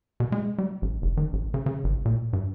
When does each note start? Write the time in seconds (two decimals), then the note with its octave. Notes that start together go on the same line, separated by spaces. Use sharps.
0.20 B2
0.32 G#3
0.58 G3
0.82 A1
1.02 F1
1.17 D#3
1.33 A1
1.54 C#3
1.66 C#3
1.84 G#1
2.05 A#2
2.33 G2